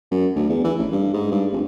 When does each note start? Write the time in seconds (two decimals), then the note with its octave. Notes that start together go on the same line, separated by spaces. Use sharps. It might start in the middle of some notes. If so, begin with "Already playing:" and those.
0.11 F#2
0.35 D2
0.49 E2
0.64 E3
0.78 A1
0.91 G2
1.13 G#2
1.31 G2
1.52 F1